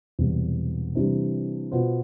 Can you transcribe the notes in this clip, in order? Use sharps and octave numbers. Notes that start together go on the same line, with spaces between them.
E1 E2 C3 G3
C3 E3 G3 D4
B2 B3 F4 C5